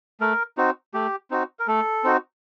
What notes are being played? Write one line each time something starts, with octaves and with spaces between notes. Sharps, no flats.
A3 A#4
C4 D#4 F#4
A3 G4
C4 D#4 F#4
A#4
A3 A4
C4 D#4 F#4